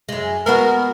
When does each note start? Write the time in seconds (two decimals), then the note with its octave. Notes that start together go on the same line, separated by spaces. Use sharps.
0.09 F#2 G#3
0.46 G#3 B3 F#4 A#4